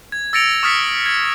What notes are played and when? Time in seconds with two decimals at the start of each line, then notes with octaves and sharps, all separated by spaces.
0.12 G#6
0.33 E6 A6 A#6 C#7 D7 F7
0.63 C#6 D#6 F6 A6 B6 C#7
1.06 G#6 C#7